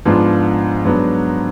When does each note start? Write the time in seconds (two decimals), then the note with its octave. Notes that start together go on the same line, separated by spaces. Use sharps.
0.05 G#2 F3 B3 D4 F4
0.85 G#2 F#3 B3 D4